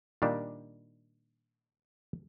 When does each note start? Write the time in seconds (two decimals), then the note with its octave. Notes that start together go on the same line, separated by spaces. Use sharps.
0.22 A#2 D#3 G3 D4